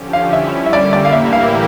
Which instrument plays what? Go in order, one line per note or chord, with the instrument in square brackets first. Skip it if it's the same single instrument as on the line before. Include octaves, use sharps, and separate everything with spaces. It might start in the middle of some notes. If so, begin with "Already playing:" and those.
Already playing: [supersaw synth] D3 F3 C#4 G4
[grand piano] F5
[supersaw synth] G3 C#4 E4 [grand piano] E5
[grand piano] E5
[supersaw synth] D3 G3 A#3 [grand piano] D5
[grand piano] D5
F5
[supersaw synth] A2 E3 A#3 E4 G4 [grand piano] E5
[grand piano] F5